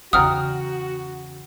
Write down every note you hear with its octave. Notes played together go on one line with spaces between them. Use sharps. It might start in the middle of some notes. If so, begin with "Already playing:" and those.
E2 C#3 F#4 F#5 G5 A#5 D#6 F6